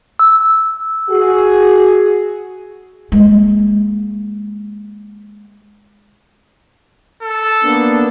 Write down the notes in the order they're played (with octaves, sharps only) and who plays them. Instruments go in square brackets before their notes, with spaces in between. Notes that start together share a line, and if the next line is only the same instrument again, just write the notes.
[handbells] E6
[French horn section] F#4 G#4
[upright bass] G#3 A#3
[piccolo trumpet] A4
[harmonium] A#3 B3 D4